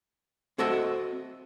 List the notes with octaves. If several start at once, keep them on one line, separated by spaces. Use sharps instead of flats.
C4 F#4 A4 D#5 E5